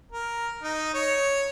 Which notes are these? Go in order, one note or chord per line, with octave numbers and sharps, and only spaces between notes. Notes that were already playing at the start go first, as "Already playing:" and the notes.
A#4
D#4
C#5